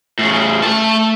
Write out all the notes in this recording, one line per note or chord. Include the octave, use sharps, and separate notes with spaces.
A2 C#3
A3 A5